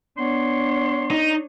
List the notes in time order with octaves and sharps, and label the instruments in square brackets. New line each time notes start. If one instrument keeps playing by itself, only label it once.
[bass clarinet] B3 [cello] D4 C#5 [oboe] C6
[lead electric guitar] D#4